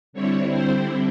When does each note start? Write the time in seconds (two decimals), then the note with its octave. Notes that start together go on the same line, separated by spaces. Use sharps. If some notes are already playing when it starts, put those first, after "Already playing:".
0.13 D3 G3 C4 E4 C#5
0.50 C5